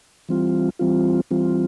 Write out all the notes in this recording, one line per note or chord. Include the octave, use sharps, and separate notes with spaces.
E3 G3 C4 F4
E3 G3 C4 F4
E3 G3 C4 F4